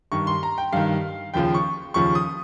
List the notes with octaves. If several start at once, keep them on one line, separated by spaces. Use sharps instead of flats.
G2 D#3 C#6
C6
A#5
G5
G2 D#3 F5
D#2 C#3 F3 G5
C#6
D#2 C#3 F3 C#6
D#6